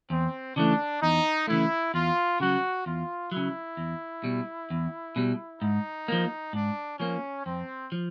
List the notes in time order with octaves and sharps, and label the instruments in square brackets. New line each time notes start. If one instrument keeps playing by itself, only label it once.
[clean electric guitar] E2 [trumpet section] C4
[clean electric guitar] C#3 E3 A3 [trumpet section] D4
[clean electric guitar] E2 [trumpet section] D#4
[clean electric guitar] C#3 E3 A3 [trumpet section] E4
[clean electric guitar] E2 [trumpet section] F4
[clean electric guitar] C#3 F#3 [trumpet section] F#4
[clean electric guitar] E2 [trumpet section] F4
[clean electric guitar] C#3 F#3 [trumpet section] E4
[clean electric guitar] E2
B2 G3
E2
B2 G3
[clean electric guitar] G#2 [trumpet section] D#4
[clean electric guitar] F3 A#3
[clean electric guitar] G#2 [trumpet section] D4
[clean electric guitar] F3 A#3 [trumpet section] C#4
[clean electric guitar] F2 [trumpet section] C4
[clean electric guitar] F3